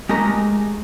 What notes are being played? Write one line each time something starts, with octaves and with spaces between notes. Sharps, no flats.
G#3 A3 G4 A#4 D#5 A#5